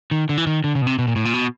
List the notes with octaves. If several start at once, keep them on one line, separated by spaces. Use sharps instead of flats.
D#3
D3
E3
D#3
D3
C#3
B2
C3
B2
A#2
A2
A#2
B2